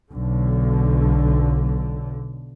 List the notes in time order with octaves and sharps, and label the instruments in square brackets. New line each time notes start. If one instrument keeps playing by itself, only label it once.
[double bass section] B1 D3